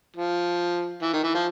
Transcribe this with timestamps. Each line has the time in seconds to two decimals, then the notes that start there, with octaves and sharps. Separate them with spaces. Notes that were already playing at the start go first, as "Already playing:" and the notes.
0.17 F3
1.02 E3
1.13 D#3
1.24 E3
1.35 F3